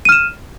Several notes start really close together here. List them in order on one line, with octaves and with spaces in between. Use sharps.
D#7 F6 E7